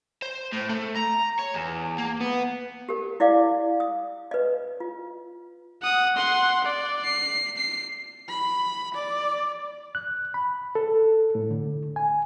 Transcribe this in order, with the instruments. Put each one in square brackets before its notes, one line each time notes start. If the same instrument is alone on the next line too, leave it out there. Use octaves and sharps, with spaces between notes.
[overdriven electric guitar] C5
A2
A3
A#5
C#5
E2
A#3
B3
[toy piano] G4 A#4
E4 D5 F5 D6
D#6
B4 D#5
F4
[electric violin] F#5 D#6
F#5 C6
D5
C7
C7
[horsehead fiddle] B5
D5
[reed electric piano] F#6
B5
A4
A2
D3
G#5